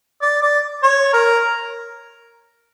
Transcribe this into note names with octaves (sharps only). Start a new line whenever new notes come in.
D5
D5
C#5
A#4